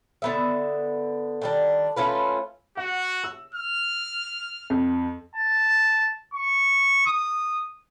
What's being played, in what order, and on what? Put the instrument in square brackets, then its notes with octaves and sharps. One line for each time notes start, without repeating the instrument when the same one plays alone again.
[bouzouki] D3 B3 E5
D#3 G3 D4
A3 C#4 F4 B4
[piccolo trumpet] F#4 [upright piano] F#5
[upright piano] E6
[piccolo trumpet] F6
[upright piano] F2
[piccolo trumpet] A5
C#6
D#6